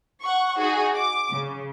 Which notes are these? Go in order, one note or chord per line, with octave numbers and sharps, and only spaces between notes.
F#5 C#6
D#4 F#4 G#4
D6
C#3